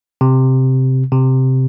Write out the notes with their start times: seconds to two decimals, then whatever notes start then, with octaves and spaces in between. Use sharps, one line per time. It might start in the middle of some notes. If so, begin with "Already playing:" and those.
0.21 C3
1.12 C3